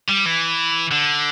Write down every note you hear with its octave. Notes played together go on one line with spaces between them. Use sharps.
G3
E3
D3